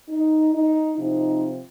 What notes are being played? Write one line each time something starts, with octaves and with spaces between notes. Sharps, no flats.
D#4
D#4
C3 F3 C4 D#4